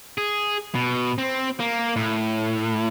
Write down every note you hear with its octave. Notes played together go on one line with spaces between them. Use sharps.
G#4
B2
C4
A#3
A2